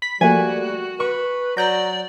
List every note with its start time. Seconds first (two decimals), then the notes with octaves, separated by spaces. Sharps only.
0.02 B5 B6
0.21 F3 G3 A3 A#3 F#4 G#5
1.00 B4 C#6
1.57 F#3 D5 A#5 G6 A#6